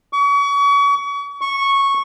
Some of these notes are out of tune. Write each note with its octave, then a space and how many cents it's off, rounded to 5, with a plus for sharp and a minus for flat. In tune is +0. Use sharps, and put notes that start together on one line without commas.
C#6 +35
C#6 -10